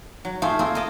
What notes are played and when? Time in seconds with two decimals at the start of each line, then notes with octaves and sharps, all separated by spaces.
0.25 F#3
0.42 A3 F4 G#4 C5 G5
0.59 A#3 C4 F4 G#4
0.75 A#3 D#5 A5